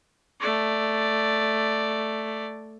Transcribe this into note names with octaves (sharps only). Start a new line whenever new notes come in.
A3 D5